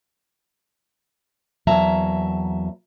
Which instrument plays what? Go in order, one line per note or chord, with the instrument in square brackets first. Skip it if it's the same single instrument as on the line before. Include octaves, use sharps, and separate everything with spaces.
[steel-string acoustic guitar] E2 F#3 A#3 E5 A5 A#5